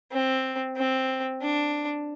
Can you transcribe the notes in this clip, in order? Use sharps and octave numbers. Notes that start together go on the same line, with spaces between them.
C4
C4
D4